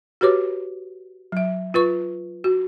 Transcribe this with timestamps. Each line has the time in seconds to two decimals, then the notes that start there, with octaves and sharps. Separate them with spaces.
0.21 F#4 G4 B4 C#5 D6
1.32 F#3 E5
1.74 F4 B4 C#6
2.44 F#4